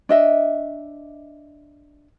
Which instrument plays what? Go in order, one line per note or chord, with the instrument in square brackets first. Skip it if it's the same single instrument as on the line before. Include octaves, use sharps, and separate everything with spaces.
[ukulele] D4 D#5 E5